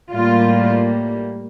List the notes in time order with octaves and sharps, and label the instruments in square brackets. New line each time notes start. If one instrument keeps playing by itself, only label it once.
[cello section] A2 G3 A#3 F4